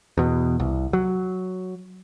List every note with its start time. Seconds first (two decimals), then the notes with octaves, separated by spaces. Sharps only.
0.17 E2 B2
0.60 C2
0.93 F#3